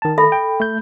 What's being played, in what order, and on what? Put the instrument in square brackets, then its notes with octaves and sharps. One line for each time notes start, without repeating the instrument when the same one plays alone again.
[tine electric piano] D#3 A5
[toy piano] A4 E5 B5
[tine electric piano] G5
A3 G6